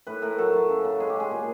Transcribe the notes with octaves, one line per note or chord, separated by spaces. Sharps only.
A2 B4
A2 A#4
F#3 A4
F#3
C#3
C#3
G#3 G#4
G4
G#3 G#4
A#2